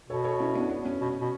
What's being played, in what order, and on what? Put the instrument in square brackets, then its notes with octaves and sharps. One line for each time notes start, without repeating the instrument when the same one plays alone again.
[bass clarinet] B2 [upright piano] A4 C#5
[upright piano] A4 C#5
C#4 E4
B3 D4
B3
C#4
[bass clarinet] B2
B2